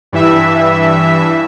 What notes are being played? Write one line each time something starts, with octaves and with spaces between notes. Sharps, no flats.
G2 E3 E5